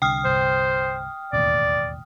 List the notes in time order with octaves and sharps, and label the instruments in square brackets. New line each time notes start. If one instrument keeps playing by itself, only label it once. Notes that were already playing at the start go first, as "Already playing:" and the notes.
[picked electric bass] C2 D3 [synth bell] G5 D#6 F6
[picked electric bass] G1 C2 [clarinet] C5
[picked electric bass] E1 A1 D#2 [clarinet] D5